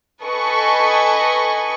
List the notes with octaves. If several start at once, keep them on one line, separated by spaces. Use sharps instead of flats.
A4 B4 D#5 G#5 C#6